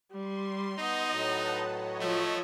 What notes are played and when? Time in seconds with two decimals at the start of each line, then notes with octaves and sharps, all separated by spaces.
0.11 G3 C6
0.79 B3 D#4 D#5
1.11 A2 F#3 B4 F#5 A5
1.63 C#5 D#5
2.01 F3 A3